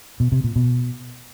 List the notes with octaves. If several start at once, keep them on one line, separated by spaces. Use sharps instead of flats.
B2
C3
A#2
B2